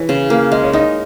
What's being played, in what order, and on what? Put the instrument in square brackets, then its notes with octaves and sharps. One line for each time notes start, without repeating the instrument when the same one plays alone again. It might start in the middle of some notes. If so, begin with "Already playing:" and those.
Already playing: [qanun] E3 G#4 [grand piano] C#5
[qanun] C#3
A#3
[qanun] G#3 [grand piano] D#5
[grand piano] C#5
[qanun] D#4 [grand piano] D#5